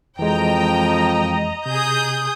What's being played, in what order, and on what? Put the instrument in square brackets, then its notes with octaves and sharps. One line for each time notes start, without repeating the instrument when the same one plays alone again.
[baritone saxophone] F2 [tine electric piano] E3 G#3 [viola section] D#5 A#5 [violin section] G5
[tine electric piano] C3 [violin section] G#4 D#6 G6